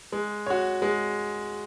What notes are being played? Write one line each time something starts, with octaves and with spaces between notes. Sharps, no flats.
G#3
F#4 C#5
G#3